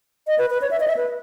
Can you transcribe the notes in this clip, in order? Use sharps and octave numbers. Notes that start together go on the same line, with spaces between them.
D#5
B4
B4
C#5
E5
D#5
E5
B4